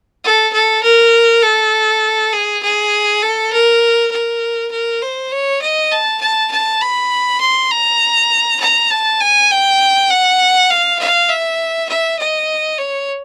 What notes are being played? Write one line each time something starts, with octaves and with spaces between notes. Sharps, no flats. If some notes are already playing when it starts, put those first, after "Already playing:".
A4
A4
A#4
A4
G#4
G#4
A4
A#4
A#4
A#4
C5
C#5
D#5
A5
A5
A5
B5
C6
A#5
A#5
A5
G#5
G5
F#5
F5
F5
E5
E5
D#5
C#5